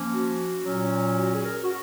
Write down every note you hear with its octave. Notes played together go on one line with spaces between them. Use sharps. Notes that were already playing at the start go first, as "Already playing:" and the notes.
Already playing: F3 A#3 C#4
F#4
A#2 F#3 C#4
F#4
G#4
A#4
F#4